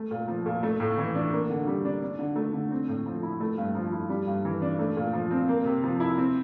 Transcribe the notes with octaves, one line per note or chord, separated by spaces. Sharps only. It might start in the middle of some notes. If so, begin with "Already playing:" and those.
Already playing: A3
A#2
F3
A#2
A3
A2
E3
D4
A#3
D3
G3
D4
D4
D3
A3
D3
C4
A2
F3
E4
A3
G2
F3
E4
G3
G2
E3
D4
A3
A#2
F3
C4
A#3
C3
F3
E4
C4